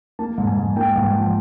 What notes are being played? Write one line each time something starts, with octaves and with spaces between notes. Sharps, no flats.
A#3 A5
G#2
G#5
G#2
A#3 G5
G#2
F#5
F3